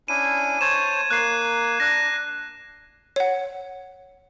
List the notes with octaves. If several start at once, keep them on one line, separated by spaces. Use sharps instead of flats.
C#4 D4 E4 D#7
C5 C#5 A5 G#6 E7
A#3 F#6 C7
D4 F#6 A#6
C#5 F#5